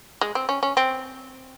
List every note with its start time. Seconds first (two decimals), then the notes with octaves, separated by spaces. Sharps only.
0.21 G#3
0.35 C4
0.49 C#4
0.63 C#4
0.77 C4